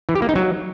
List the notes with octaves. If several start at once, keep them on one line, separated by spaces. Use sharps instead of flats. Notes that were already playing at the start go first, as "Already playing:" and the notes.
E3
G4
A#3
D#4
F#3